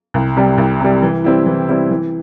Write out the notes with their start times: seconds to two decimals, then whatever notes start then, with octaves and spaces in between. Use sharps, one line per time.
0.14 C2
0.36 C3 G3
0.58 C2
0.80 C3 G3
1.02 E3
1.24 G3 C4 E4
1.46 E3
1.68 G3 C4 E4
1.91 E3